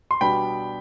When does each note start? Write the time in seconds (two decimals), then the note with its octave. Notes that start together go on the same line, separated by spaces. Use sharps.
0.11 C6
0.21 B2 G3 B3 D4 G5 B5